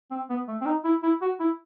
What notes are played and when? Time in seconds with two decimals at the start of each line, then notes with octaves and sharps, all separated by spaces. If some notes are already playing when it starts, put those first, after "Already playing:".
0.11 C4
0.29 B3
0.48 A3
0.61 C4
0.66 D#4
0.84 E4
1.03 E4
1.21 F#4
1.40 E4